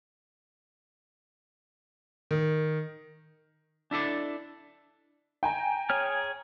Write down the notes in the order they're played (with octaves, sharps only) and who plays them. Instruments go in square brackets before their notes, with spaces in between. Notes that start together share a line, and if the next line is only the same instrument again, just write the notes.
[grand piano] D#3
[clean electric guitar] D4 E4 A4 D5
[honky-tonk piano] G5 G#5 A#5
[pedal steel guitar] G#4 C#5 F6